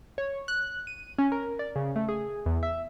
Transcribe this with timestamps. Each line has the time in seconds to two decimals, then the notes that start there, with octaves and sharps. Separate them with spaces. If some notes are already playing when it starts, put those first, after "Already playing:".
0.18 C#5
0.48 F#6
0.87 D#7
1.18 C#4
1.32 A#4
1.59 D5
1.76 C#3
1.96 A3
2.09 G#4
2.46 E2
2.63 E5